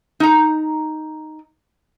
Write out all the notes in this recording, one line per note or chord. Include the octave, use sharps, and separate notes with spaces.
D#4 A#5